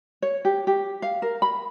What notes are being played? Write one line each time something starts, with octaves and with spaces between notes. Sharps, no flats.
C#5
G4
G4
F5
A#4
B5